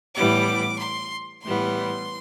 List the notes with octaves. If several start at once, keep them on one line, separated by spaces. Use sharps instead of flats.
A2 E3 G3 B3 D6
C6
A2 E3 G3 B3 C6